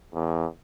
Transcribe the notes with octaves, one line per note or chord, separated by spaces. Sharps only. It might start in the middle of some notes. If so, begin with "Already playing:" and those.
E2